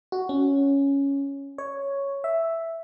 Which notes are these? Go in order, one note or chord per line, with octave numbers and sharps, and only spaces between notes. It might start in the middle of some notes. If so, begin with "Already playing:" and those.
F#4
C#4
C#5
E5